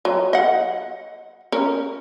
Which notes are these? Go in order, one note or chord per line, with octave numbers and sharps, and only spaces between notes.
F#3
D#5 F#5
C#4 A#4